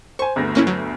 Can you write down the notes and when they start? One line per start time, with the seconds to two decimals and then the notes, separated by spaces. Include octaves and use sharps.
0.19 C5 G#5 C#6
0.36 G1 D2 A#6
0.55 A#3 C#4 E4
0.67 F#3